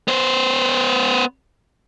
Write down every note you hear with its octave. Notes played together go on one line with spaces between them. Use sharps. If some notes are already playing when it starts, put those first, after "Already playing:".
B3 C5